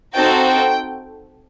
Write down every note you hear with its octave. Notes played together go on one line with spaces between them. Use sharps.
C4 D#4 F#4 A4 G5
G5